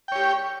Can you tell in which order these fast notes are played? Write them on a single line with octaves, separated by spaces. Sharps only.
G5 C#5 G4